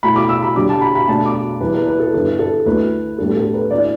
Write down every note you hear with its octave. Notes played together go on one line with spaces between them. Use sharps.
B2 A3 E4 B5
D6
E6
B5
D3 G3 D4 D6
A5
B5
B5
B2 A3 D4 A5
D6
E2 E3 G3 E4 B4
B4
B4
A4
G2 D3 B3 E4 B4
A4
D2 D3 A3 E4 B4
A2 G3 B3 D4 A4
A4
B4
D3 A3 E4 D5